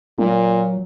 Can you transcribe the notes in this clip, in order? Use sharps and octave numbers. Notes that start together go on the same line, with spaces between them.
A#2 F#3